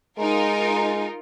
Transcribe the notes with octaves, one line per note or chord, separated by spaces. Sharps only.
G#3 D#4 F4 A#4